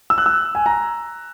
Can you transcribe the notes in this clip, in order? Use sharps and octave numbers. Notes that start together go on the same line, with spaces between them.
E6
F#6
E6
G#5
A#5